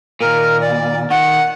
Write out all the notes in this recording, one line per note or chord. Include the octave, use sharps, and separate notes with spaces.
D#2 A#2 A#4
D5
D#3 F#5